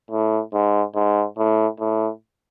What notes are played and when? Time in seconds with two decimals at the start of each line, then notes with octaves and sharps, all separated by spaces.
0.11 A2
0.53 G#2
0.95 G#2
1.37 A2
1.79 A2